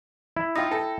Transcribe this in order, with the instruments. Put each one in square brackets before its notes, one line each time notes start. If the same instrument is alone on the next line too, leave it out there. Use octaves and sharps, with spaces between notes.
[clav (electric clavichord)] E4
[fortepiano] D#4 F4 [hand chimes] G5 E6 A#6
[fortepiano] A4